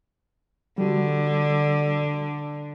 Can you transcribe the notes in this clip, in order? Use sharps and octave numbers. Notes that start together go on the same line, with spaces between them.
D3 G3 F#4